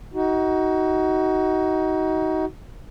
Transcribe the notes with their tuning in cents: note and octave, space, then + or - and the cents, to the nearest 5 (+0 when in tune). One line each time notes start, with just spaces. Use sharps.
D#4 +25 F#4 +20